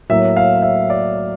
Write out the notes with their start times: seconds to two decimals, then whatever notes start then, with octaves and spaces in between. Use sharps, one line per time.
0.09 A2 F#3 A#3 E5
0.37 F5
0.62 E5
0.90 D5